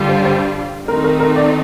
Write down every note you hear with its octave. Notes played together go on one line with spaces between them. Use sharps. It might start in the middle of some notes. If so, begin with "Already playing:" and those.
Already playing: G2 D3 G3 D4 F4
C5
C5
D#3 A3 C4 D#4 A#4
A#4
A#4
D5